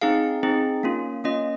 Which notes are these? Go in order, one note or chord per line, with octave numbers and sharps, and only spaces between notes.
C4 D#4 G#4 F5
C4 D#4 G#4
A#3 C#4 F4
A#3 C#4 F4 D#5